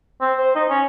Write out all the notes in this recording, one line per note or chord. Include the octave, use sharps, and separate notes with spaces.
C4
C5
D#4
C#4